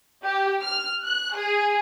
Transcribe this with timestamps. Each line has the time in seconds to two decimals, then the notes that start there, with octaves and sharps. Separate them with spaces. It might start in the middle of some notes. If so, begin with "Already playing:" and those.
0.23 G4
0.64 F6
1.04 F#6
1.35 G#4